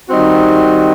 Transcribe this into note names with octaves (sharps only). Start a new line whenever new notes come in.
D#3 G3 C4 D#4 F#4